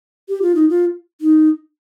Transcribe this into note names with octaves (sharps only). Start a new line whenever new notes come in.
G4
F4
D#4
F4
D#4